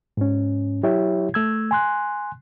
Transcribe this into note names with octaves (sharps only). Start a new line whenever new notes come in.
G#2 C#4
F#3 E4 G4 C#5 E5
A3 E6 G#6
G#5 C6 F#6